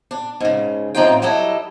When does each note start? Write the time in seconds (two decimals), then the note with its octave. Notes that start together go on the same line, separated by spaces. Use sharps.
0.11 D4
0.40 G#2 C#3
0.95 F#2 A2 C4 D#4 F4 G5
1.22 F#3 G3 E4 A4 D#5